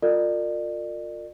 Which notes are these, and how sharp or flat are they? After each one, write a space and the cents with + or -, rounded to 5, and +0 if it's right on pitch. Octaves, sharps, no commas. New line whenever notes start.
F4 +25 A#4 -35 D5 +35